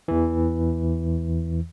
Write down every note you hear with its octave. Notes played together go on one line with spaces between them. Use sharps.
E2 E3